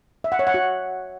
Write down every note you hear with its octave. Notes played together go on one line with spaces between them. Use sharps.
E5
F#5
C#5
F#5
F#4